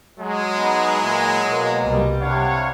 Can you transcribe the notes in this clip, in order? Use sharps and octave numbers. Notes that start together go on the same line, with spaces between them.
F#3 G#3
B3 D#4
A#2 E4
B2 A#3
C2 G3
C3 D4 E4 C#5 F5 F#5